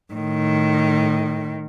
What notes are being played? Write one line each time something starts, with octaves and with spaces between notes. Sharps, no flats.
A2 D#3